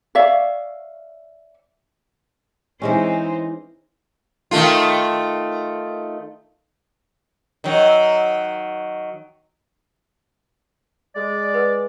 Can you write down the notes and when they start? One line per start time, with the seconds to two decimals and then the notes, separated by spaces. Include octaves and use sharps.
0.15 C#5 D5 E5 F5
2.82 E3 G#3 C4 C#4 D#4 C5
4.51 D#3 A3 F4
7.64 D#3 F#3
11.16 G#3 D5
11.54 B4 F#5